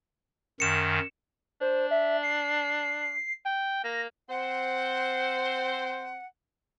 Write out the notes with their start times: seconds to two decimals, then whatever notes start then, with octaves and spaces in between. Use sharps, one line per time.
0.60 F#2 D#3 C#7 E7
1.61 D4 C5
1.91 E5
2.23 C7
3.45 G5
3.84 A#3 A#6
4.29 C4 C5 F#5